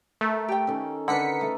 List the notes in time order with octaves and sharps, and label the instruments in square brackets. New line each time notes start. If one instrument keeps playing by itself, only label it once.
[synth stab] A3 [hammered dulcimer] A#4
[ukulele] G4 G5
[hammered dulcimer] D#3 C#4 A4
[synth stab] D3 B6 C#7 [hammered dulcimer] A#4 B4 D#5 [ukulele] F#5
[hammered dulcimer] A3 A5